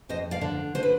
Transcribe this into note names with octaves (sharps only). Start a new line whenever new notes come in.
F2 C5 D#5
D5 F5
D3
D3 C5
B4